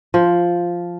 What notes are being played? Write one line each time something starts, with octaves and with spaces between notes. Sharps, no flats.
F3